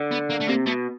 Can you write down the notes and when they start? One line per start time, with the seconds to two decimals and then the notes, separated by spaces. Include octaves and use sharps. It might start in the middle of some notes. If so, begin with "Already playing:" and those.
Already playing: D3
0.12 B3
0.30 A#3
0.41 A3
0.48 C3 A#3
0.66 B2 A3